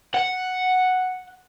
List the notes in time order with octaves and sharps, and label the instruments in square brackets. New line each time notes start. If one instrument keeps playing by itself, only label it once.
[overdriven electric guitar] F#5